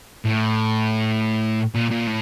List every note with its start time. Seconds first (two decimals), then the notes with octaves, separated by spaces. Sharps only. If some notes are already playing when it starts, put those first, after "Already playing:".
0.25 A2
1.74 A#2
1.91 A#2
2.07 A2